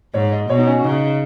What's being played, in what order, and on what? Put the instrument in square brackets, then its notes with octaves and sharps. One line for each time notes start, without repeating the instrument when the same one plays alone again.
[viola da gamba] G#2 [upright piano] C#5
[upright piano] D#5
[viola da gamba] B2 [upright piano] C#5
[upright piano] D#4
C#4
F#4
[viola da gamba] C#3 [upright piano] D#4